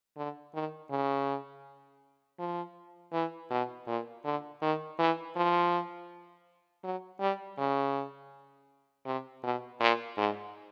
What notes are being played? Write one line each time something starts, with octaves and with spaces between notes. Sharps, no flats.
D3
D#3
C#3
F3
E3
B2
A#2
D3
D#3
E3
F3
F#3
G3
C#3
C3
B2
A#2
G#2